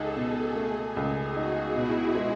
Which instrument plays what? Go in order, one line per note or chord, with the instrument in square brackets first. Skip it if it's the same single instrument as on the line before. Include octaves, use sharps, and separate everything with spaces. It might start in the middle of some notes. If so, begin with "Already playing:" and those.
Already playing: [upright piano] C#2 D#4 [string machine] G#4 A4
[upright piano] B2
[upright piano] A3 [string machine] G#4
[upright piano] C#2
[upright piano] D#4 [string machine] F#4
[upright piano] B2 [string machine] E4
[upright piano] G#3